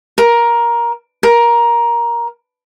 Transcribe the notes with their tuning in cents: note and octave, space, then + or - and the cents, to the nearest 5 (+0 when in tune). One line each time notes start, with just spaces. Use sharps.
A#4 +15
A#4 +15